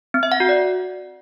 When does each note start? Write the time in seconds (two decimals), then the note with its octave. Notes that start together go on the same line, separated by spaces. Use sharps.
0.14 C4
0.23 E5
0.32 F#5
0.40 F#4
0.49 D5